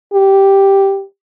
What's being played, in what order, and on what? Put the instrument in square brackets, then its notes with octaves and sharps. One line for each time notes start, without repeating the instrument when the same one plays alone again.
[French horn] G4